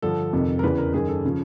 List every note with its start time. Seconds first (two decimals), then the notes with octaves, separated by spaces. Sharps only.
0.02 G2 D3 F3 A4
0.33 F2 C3 D#3
0.59 A#4
0.63 E2 C#3 E3 B4
0.78 A#4
0.94 F#2 D#3 G#4
1.09 A4
1.25 C#3 F3